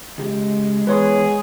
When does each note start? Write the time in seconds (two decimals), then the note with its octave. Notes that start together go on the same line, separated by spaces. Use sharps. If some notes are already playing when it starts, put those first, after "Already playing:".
0.18 C#3 G#3 G4
0.87 E2 G#4 B4 C#5 G#5 C6